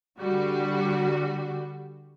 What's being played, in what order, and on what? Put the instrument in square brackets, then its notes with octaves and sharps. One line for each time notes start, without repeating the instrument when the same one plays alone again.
[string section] D3 G3 F#4